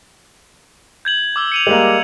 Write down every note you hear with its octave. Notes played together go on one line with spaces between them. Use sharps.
G6 G#6 F#7
D6 E6 G7
C#7 D#7 F7
G3 G#3 A#3